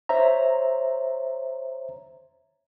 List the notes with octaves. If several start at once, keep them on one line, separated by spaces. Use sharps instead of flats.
C5 C#5 E5 A#5